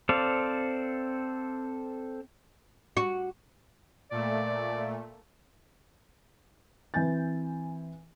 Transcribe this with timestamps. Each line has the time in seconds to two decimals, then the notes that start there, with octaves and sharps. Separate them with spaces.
0.09 C4 A4 C5 D5 F5
2.97 F#4
4.11 A#2 A3 D5
6.94 E3 C4 G#5 G6 A6